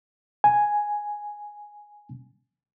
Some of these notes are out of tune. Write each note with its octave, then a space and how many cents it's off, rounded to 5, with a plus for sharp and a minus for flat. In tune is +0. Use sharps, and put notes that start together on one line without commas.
G#5 +0